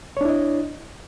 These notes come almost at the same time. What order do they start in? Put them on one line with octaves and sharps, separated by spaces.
C#5 D4 E4 D#5